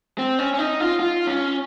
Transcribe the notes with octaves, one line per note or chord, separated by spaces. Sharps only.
C4
C#4
C#4
D#4
F4
F4
C#4